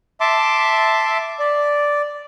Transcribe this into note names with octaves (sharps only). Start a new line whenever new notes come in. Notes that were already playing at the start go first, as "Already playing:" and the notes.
E5 A5 C6 D6
D5